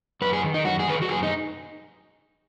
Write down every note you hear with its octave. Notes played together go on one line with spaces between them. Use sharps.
F#2 B4
G#4
D#3
D#4
F#2 F#4
G#4
D#3 B4
G#4
F#4
F#2 G#4
D#4